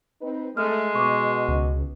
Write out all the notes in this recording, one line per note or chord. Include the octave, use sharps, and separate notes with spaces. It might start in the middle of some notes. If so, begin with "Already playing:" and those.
C4 D#4 B4
G#3 A3 F6
B2 C#6 D6
C#2